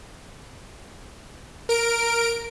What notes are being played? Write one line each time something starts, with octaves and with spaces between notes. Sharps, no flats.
A#4 D7